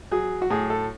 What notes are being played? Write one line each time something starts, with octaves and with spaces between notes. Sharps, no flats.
F#3 G#4
F#4
A2 G#4
A4